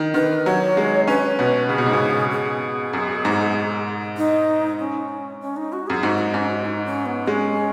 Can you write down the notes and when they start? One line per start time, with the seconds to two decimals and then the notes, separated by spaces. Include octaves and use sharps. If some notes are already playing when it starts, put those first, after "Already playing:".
Already playing: D#3
0.14 D#3 B4
0.45 F#3 C#5
0.77 G#3
1.07 C#4 B4
1.39 B2
1.69 C#3 G#4
1.78 B2
1.86 G#2
1.93 B2
2.31 G#4
2.93 F#2
3.25 G#2
4.17 D#4
4.79 C#4
5.41 C#4
5.57 D#4
5.73 F#4
5.87 F#2 G#4
6.03 G#2 F#4
6.18 D#4
6.34 G#2 C#4
6.49 F#4
6.65 D#4
6.86 C#4
7.06 B3
7.27 G#3 C#4